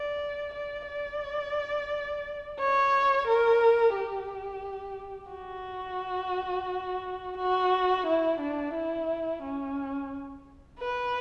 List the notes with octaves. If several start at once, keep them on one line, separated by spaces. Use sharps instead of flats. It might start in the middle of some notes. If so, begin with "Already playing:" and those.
Already playing: D5
D5
D5
C#5
A#4
G4
F#4
F#4
E4
D4
E4
C#4
B4